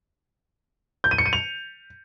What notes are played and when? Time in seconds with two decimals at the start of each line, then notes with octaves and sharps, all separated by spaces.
1.04 G6
1.11 D#7
1.18 C#7
1.26 D#7
1.33 F7